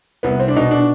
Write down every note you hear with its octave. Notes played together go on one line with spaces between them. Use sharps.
C2 B3
C4
D4
B2 D#4
D4